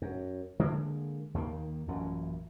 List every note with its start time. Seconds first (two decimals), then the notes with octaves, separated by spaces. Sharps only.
0.02 F#2
0.59 D3 G#3 A#3
1.34 D#2 D#3 G#3 A#3
1.88 A1 F#2 A#2